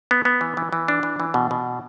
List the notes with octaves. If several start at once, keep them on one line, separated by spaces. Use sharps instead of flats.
B3
B3
E3
E3
E3
D4
E3
E3
B2
B2